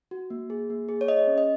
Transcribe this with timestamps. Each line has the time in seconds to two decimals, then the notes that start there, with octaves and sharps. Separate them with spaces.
0.11 F#4
0.30 A#3
0.50 G#4
0.70 A#3
0.89 G#4
1.01 C#5
1.08 G#4 D#5
1.27 C#4
1.38 D#5